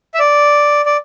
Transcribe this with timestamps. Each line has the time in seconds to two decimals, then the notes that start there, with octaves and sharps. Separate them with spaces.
0.14 E5
0.19 D5
0.86 D5